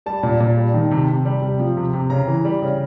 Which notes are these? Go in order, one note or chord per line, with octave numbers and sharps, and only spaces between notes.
G3 A5
A#2
A#2
G3
D#3
C3
C3
G3
C3
F3
C3
C3
C#3 A#5
E3
G3
C#3